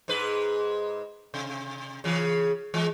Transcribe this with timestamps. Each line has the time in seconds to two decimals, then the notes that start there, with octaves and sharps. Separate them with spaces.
0.08 G#2 G#3 B4
1.34 C3
2.04 C#3 E3
2.74 E3 G#3